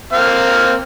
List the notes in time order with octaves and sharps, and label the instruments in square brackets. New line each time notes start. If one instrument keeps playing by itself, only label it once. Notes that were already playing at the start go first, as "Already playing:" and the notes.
[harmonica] A#3 C4 F5